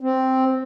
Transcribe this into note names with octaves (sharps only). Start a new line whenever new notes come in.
C4